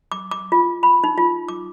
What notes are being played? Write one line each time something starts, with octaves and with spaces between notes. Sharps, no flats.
D6
D6
F4
B5
D#4
F4
D6